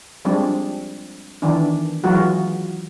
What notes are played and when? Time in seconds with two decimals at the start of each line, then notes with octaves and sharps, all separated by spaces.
0.25 F3 G3 G#3 C4 D4
1.42 D#3 E3 D4
2.04 E3 F#3 G#3 F4 F#4